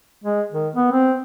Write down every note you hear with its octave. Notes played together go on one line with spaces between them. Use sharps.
G#3
D#3
B3
C4